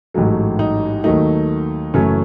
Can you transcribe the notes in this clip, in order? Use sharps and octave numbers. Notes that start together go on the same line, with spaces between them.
A1 G#2 F#3 A3
D#4
D#2 D#3 F#3 A3 D#4
F#1 F#2 E3 A3 C#4